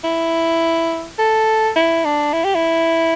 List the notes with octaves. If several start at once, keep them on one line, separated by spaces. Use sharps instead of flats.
E4
A4
E4
D4
E4
G4
E4